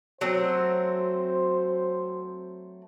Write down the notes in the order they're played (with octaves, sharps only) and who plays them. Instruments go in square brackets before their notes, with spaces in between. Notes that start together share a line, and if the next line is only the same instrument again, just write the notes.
[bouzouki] F#3 A3 C4 [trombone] C5